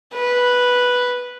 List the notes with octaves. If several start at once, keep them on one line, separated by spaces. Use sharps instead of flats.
B4